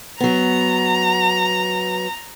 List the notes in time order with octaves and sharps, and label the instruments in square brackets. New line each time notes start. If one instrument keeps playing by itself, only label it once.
[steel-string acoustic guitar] F#3 B3 [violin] A#5